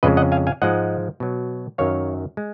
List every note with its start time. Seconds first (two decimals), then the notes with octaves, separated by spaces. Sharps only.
0.03 F2 C#3 G#3 B4 D#5
0.17 D#5 F#5
0.32 F5 G#5
0.47 F5 G#5
0.62 G#2 F3 G#3 D#5 F#5
1.20 B2 F#3
1.78 F#2 D#3 F#3 C#5 F5
2.37 G#3